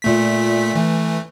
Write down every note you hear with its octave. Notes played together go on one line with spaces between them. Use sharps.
A#2 A3 B6
E3 A3